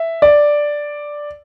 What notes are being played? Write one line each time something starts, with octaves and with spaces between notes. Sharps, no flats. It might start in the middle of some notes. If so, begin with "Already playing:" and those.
Already playing: E5
D5